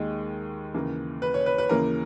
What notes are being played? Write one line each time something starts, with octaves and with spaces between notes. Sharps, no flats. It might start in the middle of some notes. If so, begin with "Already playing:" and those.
Already playing: D#2 D#3 G#3
D#2 C#3 E3 A#3
B4
C#5
B4
B4
D#2 C#3 E3 A#3 A#4